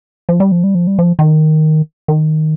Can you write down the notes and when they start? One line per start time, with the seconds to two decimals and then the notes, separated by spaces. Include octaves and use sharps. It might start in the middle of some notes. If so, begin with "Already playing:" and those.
0.29 F3
0.40 G3
0.52 F3
0.64 G3
0.75 F3
0.87 G3
0.99 F3
1.19 D#3
2.08 D#3